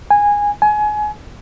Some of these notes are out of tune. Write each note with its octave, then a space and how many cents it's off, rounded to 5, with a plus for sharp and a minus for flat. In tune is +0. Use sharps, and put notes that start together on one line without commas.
G#5 -15
G#5 +25